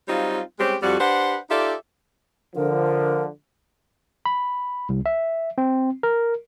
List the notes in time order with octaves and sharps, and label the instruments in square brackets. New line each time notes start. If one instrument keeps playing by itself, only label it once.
[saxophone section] F#3 G3 C4 D#4 F4
G3 G#3 C4 C#4 G4
F2 G3 F#4
D4 G4 B4 C5 F#5
D#4 F4 G4 A4 D5 E5
[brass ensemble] D3 F3 [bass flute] A#4
[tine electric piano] B5
C2
E5
C4
A#4